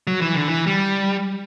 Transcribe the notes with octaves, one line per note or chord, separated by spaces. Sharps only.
F#3
E3
D3
E3
G3